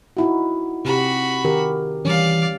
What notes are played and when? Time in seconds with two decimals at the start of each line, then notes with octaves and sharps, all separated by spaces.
0.17 D#4 E4 F#4
0.85 C3 F#4 G4 B5
1.45 D#3 G4 A#4
2.05 E3 G3 C#4 D5 F5